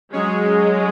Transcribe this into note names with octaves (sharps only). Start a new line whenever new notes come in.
F#3 G#3 C#4 G#4 C#5